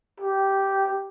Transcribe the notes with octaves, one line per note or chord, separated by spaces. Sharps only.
G4